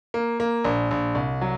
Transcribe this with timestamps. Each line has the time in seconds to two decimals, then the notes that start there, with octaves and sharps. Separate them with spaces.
0.14 A#3
0.40 A#3
0.64 A#1
0.91 A#1
1.15 C2
1.41 F#3